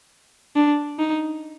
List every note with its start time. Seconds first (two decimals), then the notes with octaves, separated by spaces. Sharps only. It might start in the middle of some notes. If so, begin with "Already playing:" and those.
0.56 D4
0.99 D#4